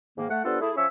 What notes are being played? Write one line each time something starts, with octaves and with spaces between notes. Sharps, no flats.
G#2 D#3 A#3
A3 F#5
G3 B3 D4 F4 A4 C5
A3 E4 G#4
F3 C#4 C#5 E5 E6